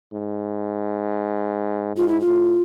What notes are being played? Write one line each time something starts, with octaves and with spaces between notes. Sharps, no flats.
G#2
G#2 F4
E4
F4
A2